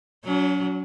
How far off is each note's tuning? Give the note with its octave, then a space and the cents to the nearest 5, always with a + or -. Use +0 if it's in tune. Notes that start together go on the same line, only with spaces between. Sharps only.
F#3 +0 C#4 +45